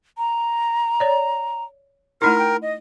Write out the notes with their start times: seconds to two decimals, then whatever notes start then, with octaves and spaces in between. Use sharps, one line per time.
0.18 A#5
1.00 C#5 D5
2.22 A3 D#4 E4 A#4 F6
2.39 G5
2.62 D#5